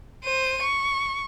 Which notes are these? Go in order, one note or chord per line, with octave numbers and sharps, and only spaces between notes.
C5 D#7
C#6